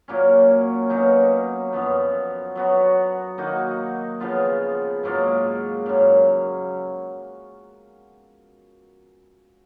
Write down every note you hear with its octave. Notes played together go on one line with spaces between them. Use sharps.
A#2 F#3 A#3 C#4
B2 F#3 A#3 D#4
F#2 F3 B3
F#3 B3 F#4
D#3 A#3 D#4 F#4
C#3 F3 B3 F4
G#2 F#3 A#3 F4
F#2 C#3 F#3